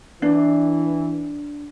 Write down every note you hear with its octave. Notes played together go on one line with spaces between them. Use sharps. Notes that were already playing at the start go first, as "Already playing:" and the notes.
E3 D4